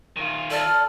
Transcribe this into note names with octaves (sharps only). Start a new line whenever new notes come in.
D#3 F4
A4 D5 F6